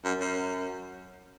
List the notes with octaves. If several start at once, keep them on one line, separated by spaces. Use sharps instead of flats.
F#2
F#2